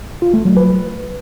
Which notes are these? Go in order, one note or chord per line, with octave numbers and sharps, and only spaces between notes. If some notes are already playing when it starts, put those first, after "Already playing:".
F4
A3
F#3
B4